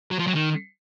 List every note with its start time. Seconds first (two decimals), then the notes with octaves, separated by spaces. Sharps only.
0.11 F#3
0.19 F3
0.27 F#3
0.35 D#3